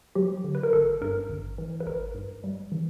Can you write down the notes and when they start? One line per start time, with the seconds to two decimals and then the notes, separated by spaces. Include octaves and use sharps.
0.15 F#3 G4
0.44 D3
0.55 B4
0.63 A#4
0.73 G1 A4
1.01 G2 A#4
1.29 G#1
1.58 E3
1.80 B4
1.86 G#1 A#4
2.14 G2
2.44 G3
2.72 E3